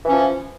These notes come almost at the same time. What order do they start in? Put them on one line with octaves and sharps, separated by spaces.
E3 C#4 F3